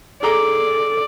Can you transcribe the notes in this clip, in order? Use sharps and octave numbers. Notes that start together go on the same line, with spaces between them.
G#4 A4 D5 A#5 D6